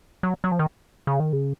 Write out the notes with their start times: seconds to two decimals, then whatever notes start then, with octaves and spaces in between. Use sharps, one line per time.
0.23 F#3
0.44 F#3
0.52 F3
0.59 D#3
1.07 C#3
1.20 D#3
1.33 C#3